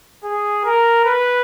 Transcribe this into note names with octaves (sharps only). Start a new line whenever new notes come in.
G#4
A#4
B4